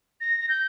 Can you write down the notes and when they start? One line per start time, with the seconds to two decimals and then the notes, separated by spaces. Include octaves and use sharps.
0.21 A#6
0.40 A#6
0.49 G6